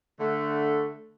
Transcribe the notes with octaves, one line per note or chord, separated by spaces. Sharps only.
D3 A3